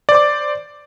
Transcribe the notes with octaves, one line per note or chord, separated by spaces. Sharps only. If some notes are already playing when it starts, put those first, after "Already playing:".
C5 D5 D6